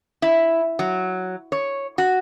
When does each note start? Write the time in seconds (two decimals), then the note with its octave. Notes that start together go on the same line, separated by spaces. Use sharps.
0.22 E4
0.79 F#3
1.52 C#5
1.98 F#4